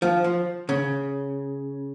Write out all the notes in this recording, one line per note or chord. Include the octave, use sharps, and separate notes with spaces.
F3
F3
C#3